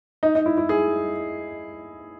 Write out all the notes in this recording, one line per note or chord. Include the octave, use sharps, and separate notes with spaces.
D#4
D#4
E4
E4
G#4